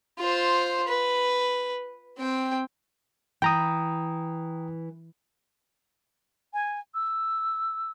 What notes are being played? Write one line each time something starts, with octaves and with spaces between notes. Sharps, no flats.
F4 C5
B4
C4 G5
E3 G5 A#5 D#6
G#5
E6